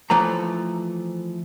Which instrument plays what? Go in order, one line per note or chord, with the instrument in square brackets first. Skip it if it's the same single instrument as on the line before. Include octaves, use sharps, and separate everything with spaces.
[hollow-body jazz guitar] E3 F3 A3 A#5